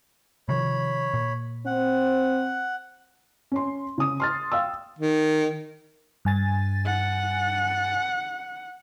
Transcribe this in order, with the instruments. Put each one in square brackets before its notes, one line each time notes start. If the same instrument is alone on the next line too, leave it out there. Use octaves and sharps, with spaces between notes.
[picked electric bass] C3 D#3 F3 [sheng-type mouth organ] C#5 B5
[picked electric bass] A#2
[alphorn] C4 [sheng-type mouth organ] F#5
[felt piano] C#4 C6
C#3 D#6
C6 F6 A6
F5 G5 E6
[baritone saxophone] D#3
[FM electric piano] G2 G#5 A6
[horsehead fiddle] F#5